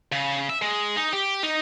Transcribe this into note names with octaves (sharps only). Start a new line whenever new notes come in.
C#3
E5
G#3
D#4
G4
D#4